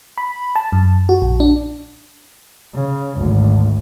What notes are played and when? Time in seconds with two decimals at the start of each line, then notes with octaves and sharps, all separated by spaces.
0.18 B5
0.56 A5
0.72 F#2
1.09 F#4
1.22 A#1
1.40 D4
2.74 C#3
3.16 G#1 D2